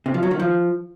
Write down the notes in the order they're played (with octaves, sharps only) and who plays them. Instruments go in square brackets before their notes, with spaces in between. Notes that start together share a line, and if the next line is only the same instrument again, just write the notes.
[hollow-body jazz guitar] C3
F3
F#3
D#3
F3